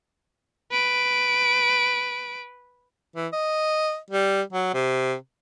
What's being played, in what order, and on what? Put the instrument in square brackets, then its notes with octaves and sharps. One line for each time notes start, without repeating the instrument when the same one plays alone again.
[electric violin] B4 D7
[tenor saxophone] E3
D#5
G3
F#3
C3